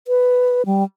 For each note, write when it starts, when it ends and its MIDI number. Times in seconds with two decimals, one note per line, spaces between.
0.08 0.62 71
0.66 0.84 55